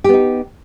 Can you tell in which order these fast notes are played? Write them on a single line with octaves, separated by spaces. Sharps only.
G4 B3 D#4